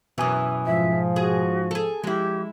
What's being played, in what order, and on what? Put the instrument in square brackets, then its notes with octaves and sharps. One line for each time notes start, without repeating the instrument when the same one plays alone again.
[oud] F#2 E3 [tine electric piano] B2 G#5 D#6
[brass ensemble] G#2 F3 [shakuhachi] E5
[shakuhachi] F#4 [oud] G#4
[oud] G#4 A4
[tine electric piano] F3 [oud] G#3 E4 [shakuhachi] G4